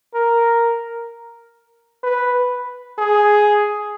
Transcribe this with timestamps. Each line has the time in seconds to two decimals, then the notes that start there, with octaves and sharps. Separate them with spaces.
0.14 A#4
2.04 B4
2.99 G#4